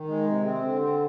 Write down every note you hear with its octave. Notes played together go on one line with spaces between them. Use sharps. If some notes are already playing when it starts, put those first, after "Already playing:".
Already playing: D#3
G#3
C3
C4
D3
C4